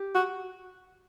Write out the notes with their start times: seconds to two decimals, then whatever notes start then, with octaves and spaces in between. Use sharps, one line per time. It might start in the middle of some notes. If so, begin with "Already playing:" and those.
Already playing: G4
0.15 F#4